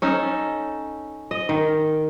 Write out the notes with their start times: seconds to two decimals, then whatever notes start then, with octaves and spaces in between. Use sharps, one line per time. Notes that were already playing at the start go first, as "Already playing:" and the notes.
0.02 C#4 D#4 A4
1.31 D#5
1.49 D#3